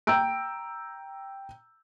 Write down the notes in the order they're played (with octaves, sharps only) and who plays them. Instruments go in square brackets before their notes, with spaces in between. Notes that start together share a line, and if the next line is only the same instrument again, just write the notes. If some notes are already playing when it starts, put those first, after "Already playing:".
[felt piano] G5 A#5 E6 G6 D7